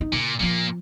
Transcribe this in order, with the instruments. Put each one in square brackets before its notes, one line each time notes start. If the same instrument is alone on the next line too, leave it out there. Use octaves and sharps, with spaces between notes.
[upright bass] D#4
[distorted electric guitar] A#2 [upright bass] C#3
[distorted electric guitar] A#2 A#3 [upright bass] F3 F4